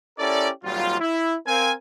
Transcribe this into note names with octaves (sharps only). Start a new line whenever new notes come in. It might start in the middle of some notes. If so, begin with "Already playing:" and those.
C#4 E4 G4 A4 A#4 D5
G#1 A#2 F#3 G3 F4
E4
C4 A#4 F5 G#5